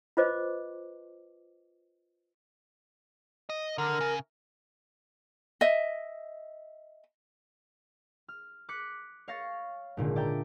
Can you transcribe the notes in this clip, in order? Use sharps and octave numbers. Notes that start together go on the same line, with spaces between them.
F4 B4 C5 D#5 D6
D#5
D3 A#4
C#3
D#5 E5
F6
D6 F#6 B6 C#7
C#5 F5 C#6 A6 A#6
G#1 A#2 D3
D5 E5 G5 A#5